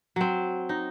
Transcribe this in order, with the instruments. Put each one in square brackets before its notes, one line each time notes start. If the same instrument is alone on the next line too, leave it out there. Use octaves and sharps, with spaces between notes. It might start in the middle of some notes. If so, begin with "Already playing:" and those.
[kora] F#3 C4
D#4